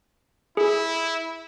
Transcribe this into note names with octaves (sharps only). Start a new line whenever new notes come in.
E4 G#4